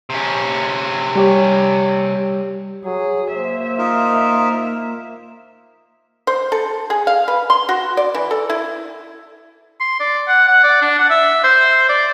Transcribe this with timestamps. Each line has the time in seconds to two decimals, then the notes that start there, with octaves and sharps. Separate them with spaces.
0.10 C3 C#4
1.16 G3 G4 C#5
2.85 F#3 G#4
3.35 A#3 C5 E5
3.78 D#4 F4 A#4
6.27 C5
6.52 A4
6.90 G#4
7.07 F5
7.28 B4
7.50 C6
7.69 F#4
7.97 D5
8.15 E3
8.31 A4
8.50 E4
9.80 C6
10.00 D5
10.28 F#5
10.48 F#5
10.63 D5
10.82 D4
10.99 F#5
11.10 E5
11.44 C5
11.89 D5